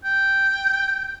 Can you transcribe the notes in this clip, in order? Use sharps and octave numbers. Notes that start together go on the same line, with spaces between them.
G5